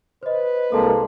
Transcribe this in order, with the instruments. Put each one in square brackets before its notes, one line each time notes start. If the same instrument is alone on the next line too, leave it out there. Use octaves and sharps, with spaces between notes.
[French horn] B4 [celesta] C5 D#5
[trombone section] C2 G#3 A#3 [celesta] A4 A5